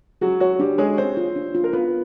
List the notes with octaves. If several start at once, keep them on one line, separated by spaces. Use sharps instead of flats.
F#3 F#4 G#4
F#3 F#4 C#5
G3 D4 G4
G#3 G#4 C#5
C4 C5 C#5
F4
D4
F4
A#4
B3 F4 B4